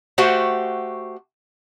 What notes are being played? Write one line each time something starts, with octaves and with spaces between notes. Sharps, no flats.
A3 F#4 G4 C5 F#5